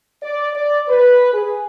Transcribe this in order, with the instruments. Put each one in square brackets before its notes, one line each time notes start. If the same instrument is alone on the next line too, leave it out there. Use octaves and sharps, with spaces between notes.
[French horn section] D5
D5
B4
G#4